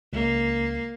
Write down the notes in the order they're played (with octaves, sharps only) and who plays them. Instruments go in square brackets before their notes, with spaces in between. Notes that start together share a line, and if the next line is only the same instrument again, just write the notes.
[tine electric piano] C#2 [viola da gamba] A#3